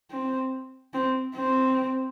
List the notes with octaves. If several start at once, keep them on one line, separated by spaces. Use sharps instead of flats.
C4
C4
C4